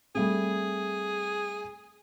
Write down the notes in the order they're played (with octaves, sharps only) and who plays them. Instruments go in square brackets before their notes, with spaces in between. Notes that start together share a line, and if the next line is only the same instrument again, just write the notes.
[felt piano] G3 A3 C4 [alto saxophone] G#4